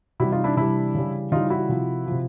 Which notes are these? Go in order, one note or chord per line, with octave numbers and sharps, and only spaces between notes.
C3 E3 G3 E4 F#4
D#4 F4
D4 E4
C3 E3 G3 D4 E4
C#3 E3 G3
C#3 E3 G3 D#4 F4
E4 F#4
C3 F3
C3 F3